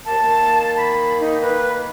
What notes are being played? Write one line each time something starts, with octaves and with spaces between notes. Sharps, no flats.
D#2 A#3 A5
D#3 A#3
B5
D#4
B4